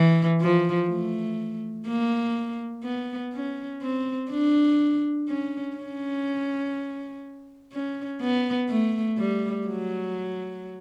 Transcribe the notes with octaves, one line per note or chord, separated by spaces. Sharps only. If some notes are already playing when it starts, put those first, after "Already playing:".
Already playing: E3
F3
A3
A#3
B3
C#4
C4
D4
C#4
C#4
C#4
B3
A3
G3
F#3